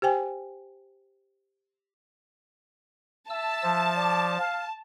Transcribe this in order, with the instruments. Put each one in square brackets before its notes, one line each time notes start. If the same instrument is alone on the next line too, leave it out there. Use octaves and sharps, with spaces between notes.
[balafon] G4 C5 G5 G#5
[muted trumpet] E5 [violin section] A5 [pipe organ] E6
[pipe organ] F3
[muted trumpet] D5
F5